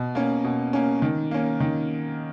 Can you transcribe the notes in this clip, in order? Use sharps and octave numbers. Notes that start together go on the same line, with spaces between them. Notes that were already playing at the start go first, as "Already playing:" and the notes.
Already playing: B2
A#3 C#4
B2
A#3 C#4
D#3
A#3 C#4
D#3